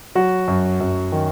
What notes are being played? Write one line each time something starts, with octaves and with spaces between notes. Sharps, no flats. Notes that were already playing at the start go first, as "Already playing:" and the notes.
F#3 F#4
F#2
F#2
D#3